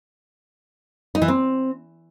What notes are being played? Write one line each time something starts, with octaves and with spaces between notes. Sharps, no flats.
D#4
E3
C4